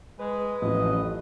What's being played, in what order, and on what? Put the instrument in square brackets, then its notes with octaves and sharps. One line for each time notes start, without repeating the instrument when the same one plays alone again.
[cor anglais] G#3 [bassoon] B4
[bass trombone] A1 [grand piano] F#2 A2 F3 [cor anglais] D#5